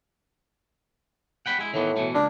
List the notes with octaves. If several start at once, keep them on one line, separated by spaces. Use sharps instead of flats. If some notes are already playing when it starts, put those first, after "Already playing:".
F#5 G5 B5
G#3 E4
A2 D#3 E3 B3
B2 E3 A3
C#2 A#3 D4